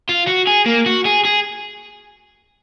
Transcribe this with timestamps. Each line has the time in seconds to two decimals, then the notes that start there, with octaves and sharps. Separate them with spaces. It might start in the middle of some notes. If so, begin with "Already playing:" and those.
0.09 F4
0.28 F#4
0.47 G#4
0.66 A#3
0.86 F#4
1.05 G#4
1.25 G#4